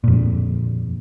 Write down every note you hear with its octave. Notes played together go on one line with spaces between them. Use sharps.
F2 A#2